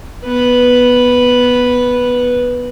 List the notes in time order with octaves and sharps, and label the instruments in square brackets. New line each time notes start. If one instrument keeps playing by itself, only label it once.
[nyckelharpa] B3 B4